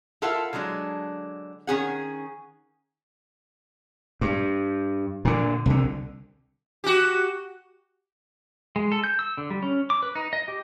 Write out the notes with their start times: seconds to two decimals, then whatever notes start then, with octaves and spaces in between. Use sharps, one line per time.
0.22 E4 F4 A4 A#4 F5 F#5
0.53 D3 F#3 G#3 D4
1.67 D#3 C#4 G#4 F#5
4.21 G2
5.25 A#2 D3
5.66 C2 D3
6.84 F#4 G4
8.76 G#3
8.92 A4
9.04 G6
9.19 E6
9.38 D3
9.50 G3
9.63 C#4
9.90 D6
10.03 B4
10.15 D#4
10.33 D#5
10.48 G4